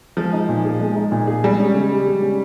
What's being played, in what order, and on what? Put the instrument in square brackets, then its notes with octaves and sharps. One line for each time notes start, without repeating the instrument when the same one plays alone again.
[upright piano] F3 [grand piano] G#3
[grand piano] D#4
A#2
G#4
G#3
D#4
A#2
G#4
[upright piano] G3 [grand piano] G#3
[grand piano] C#4
C#3
G4
G#3
C#4